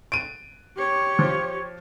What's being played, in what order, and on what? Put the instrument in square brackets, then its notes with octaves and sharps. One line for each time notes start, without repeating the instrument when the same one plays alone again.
[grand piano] D7 D#7
[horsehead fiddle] G4 C#5
[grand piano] F3